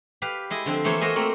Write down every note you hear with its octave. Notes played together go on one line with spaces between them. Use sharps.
G4 B4 F5
G#3 E4 D#5
D3 F3 C4
E3 A3 A#3 C5 C#5
F#4 A#4 C5 D#5 E5 G#5
A3 A#3 C4